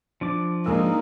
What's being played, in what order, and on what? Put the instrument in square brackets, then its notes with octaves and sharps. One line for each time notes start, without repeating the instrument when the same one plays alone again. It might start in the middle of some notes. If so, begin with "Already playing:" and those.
[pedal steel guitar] F3 D4 D6
[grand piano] G#2 G#4 E6 [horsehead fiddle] A#3 D#4